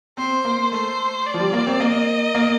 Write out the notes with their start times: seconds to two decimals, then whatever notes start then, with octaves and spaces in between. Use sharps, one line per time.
0.17 C4 C5
0.45 A#3
0.72 A3 C5
1.27 D5
1.34 F3
1.40 G3
1.53 A#3
1.67 C4
1.80 A#3 D#5
2.35 A#3